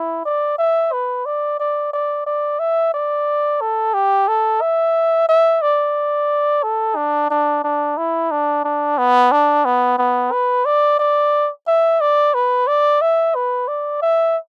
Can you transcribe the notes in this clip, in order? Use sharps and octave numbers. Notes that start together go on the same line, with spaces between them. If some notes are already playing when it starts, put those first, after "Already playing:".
Already playing: E4
D5
E5
B4
D5
D5
D5
D5
E5
D5
A4
G4
A4
E5
E5
D5
A4
D4
D4
D4
E4
D4
D4
B3
D4
B3
B3
B4
D5
D5
E5
D5
B4
D5
E5
B4
D5
E5